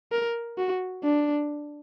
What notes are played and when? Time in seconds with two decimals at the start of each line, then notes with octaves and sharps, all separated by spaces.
0.12 A#4
0.58 F#4
1.04 D4